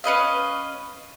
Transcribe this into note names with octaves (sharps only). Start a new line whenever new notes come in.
C#4 B4 D#5 F5